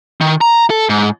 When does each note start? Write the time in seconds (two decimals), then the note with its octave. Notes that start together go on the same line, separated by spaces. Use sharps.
0.21 D#3
0.41 A#5
0.70 A4
0.89 G#2